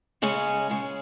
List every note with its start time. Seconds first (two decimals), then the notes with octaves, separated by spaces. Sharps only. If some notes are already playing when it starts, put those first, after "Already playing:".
0.22 C#3 G#3 C#4
0.70 C#3 G#3